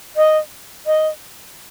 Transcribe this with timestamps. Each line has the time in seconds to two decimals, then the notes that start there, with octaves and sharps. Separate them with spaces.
0.16 D#5
0.86 D#5